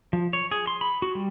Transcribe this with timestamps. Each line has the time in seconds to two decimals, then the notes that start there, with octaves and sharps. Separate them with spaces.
0.13 F3
0.33 C#5
0.51 G#4
0.67 C6
0.81 B5
1.02 F#4
1.15 G3